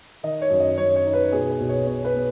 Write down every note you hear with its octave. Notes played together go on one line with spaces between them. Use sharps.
D#3 D#5
C#5
F#2
D#5
F#2 C#5
C#5
D#4
B4
B2 G#4
B4
B1
C#5
B2 C#5
B4
B3